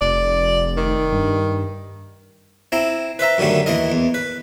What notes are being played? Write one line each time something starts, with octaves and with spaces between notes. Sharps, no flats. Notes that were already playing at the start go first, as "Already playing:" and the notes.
F1 D5
D#3
G2
C4 E4 A#5
B4 C5 E5 A#5
F#2 D3 D#3 G3 A3
D#2 E3 A#4 D#5
E2
B4